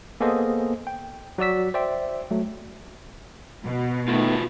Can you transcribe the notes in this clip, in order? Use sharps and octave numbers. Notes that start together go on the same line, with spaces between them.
A#3 B3 G#4 A4 C5 D#5
G5
F#3 F#4 D5 E6 B6
C5 D5 E5 G5
F#3 A3
B2
D#3 A3 B3 F4 F#4 B4